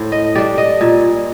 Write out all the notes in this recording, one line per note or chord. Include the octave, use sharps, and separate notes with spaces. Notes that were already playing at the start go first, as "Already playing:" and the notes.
Already playing: A2 C5
D#5
G3 D4 D5
D#5
A#2